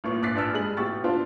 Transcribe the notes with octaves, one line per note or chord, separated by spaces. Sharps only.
A1 A#2 C#6
A#1 D6 F#6 A6 B6 C7
A#1 D4 B4 E6 F6
G2 G#3 G#4 F#7
A1 B2 G4 C#6 E6 A6
B3 D4 E4 F4 C5